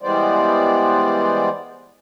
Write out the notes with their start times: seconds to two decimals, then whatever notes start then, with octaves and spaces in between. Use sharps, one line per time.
0.02 E3 G3 G#3 B3 C5 D5